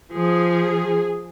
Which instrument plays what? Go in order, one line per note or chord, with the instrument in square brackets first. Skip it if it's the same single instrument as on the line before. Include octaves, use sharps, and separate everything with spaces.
[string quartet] F3 [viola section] G#4